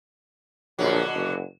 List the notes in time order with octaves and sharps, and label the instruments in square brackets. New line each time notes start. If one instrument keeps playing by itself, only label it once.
[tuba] A#1 [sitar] B2 D3 F#3
[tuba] F#1